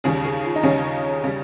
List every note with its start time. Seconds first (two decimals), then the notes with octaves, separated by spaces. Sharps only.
0.04 D#2 C#3 G3 G#4
0.24 G#4
0.44 F4
0.56 D#4
0.63 D#2 C#3 G3 C#4
1.24 C#3 G3